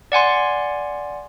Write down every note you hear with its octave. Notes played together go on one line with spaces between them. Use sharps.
D5 F#5 G#5 C6